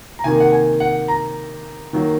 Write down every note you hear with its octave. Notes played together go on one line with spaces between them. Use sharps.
A#5
C3 D#3 A#3 G#5
F#5
G#5
F#5
A#5
D#3 F#3 A#3